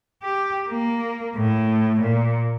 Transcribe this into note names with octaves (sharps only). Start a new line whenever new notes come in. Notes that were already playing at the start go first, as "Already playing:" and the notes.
G4
A#3
A2
A#2